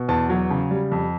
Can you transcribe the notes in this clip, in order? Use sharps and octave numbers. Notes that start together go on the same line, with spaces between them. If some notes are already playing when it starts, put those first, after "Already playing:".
Already playing: B2
E2 A5
F#3
C#3
G3
F2